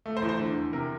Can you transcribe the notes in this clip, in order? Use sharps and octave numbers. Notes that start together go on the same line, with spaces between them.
A3
C5
E2
C5
D3
E2
C3 A#4